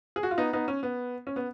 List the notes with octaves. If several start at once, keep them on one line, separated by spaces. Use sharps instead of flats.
G#4
F#4
F4
B3 D#4
B3 D#4
C#4
B3
C#4
B3